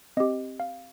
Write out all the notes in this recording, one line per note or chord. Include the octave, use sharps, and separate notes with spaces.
C4 G4 D#5
F5